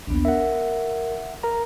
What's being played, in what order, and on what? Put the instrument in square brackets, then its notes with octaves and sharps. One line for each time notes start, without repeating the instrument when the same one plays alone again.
[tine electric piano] A#1 D#2 [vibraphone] B3 D4
[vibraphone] A#4 [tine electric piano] E5 F#5
[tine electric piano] A#4 A#5